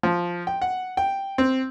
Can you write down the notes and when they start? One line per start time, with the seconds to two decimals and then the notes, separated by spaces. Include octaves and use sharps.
0.03 F3
0.47 G5
0.62 F#5
0.97 G5
1.38 C4